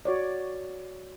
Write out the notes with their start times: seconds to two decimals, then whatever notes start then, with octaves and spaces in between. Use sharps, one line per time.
0.05 F#4 C#5 D5